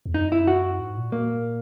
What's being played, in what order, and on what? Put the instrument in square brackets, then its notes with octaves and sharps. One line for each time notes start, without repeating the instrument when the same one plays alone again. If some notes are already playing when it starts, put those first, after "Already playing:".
[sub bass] E2
[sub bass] F#2 [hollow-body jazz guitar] D#4
[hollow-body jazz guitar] E4
F#4
[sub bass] G#2
A#2
[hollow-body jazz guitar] A#3